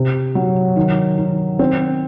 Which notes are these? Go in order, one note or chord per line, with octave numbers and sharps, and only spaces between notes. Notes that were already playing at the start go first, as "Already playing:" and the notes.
Already playing: C3
F#3
D#3
D#3
C4